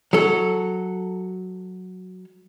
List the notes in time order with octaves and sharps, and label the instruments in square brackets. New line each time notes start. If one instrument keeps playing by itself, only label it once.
[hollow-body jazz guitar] F#3 A4